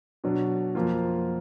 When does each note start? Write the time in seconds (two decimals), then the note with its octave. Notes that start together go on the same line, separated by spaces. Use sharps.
0.24 B2 F#3 D4
0.75 F2 F3 A#3 F4